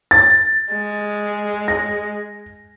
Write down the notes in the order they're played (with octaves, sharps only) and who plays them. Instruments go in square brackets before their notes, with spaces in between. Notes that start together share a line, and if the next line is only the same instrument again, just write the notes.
[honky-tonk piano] A6
[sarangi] G#3
[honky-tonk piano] A#6